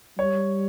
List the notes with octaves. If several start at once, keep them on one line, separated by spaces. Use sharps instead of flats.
G3 C#5